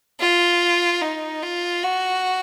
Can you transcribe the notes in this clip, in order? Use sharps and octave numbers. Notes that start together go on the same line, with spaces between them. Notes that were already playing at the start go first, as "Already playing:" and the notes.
F4
D#4
F4
F#4